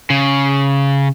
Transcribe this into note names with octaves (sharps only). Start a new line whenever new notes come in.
C#3